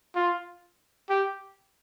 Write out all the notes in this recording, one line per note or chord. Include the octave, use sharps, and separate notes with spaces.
F4
G4